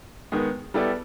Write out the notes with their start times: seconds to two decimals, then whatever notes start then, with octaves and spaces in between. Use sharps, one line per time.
0.32 D#3 G#3 B3
0.74 G3 B3 E4 A4 D5